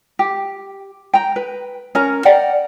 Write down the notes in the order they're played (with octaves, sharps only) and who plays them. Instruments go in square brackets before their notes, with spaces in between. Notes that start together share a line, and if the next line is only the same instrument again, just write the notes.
[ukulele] G4
G5 A#5
B4
C#4 A#4 A#5
D5 F#5 G5 A#5